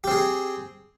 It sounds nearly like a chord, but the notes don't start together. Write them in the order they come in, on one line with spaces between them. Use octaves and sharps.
G4 C4 G#4